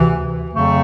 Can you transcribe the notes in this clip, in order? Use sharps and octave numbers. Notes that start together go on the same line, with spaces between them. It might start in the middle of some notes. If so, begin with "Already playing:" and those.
Already playing: D2 C3 E3
F2 C#3 F#3 A3